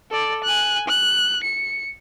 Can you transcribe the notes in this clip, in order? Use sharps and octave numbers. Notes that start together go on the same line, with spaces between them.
A4 D5
G#5 F#6
F#6
C#7